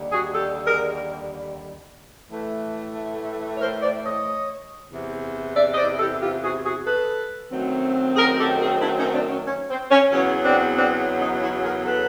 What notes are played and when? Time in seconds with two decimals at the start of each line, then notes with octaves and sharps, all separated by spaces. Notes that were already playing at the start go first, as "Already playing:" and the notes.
Already playing: D#2 D3 G3
0.12 F#4 G#4
0.34 G4 A4
0.66 G#4 A#4
2.29 A2 E3 A3
3.56 C#5
3.60 A#4 C5
3.82 C5 D5
4.04 C#5 D#5
4.90 E2 C3 E3
5.55 D5 E5
5.73 D#5
5.77 C5 D5
5.99 G4 A4
6.21 F4 G4
6.43 F#4 G#4
6.64 F#4 G#4
6.86 A4 B4
7.51 F#2 D#3 F#3 A3 C4
8.16 G#4 A#4
8.39 G4 A4
8.60 G#4 A#4
8.81 D4 E4
8.98 C#4 D#4
9.14 C4 D4
9.30 C#4
9.47 C#4
9.69 C4
9.91 C#4
10.12 E2 C#3 F#3 B3 C#4
10.44 C4 D4
10.77 C4 D4
11.21 C#4 D#4
11.42 E4 F#4
11.64 G#4 A#4
11.86 A4 B4